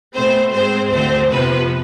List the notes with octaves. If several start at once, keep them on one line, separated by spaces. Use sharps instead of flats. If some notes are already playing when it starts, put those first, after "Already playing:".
B2 A3 C4 C5
G#2 G#3 C4 C5
D2 D3 A3 C4 C5
F2 C3 F3 B3 B4